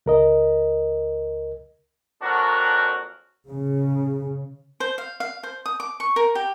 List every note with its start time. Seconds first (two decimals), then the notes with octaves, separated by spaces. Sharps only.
0.06 C#2 A#4 D#5
2.22 F2 A#2 F#3 D4 F#4 A#4
3.49 C#3
4.80 C5
4.98 F5
5.20 F5
5.43 C5
5.66 D#6
5.80 D6
6.00 C#6
6.16 A#4
6.35 G4